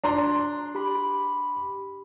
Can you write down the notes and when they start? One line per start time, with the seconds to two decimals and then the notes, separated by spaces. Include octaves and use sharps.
0.04 D4 A#5 C6
0.75 G4 B5